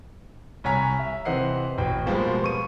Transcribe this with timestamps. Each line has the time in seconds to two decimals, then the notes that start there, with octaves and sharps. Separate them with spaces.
0.64 C2 C#5 G#5 A#5 B6
0.99 E5
1.25 C3 E3 C5 D#5 F#5 C7
1.78 A1 F#4 G5
2.06 B2 F3 G3 G#3 A#3
2.42 B3 C#6 D#7